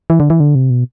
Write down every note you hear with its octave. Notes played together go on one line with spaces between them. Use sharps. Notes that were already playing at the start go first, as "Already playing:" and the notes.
E3
D3
E3
D3
C3
B2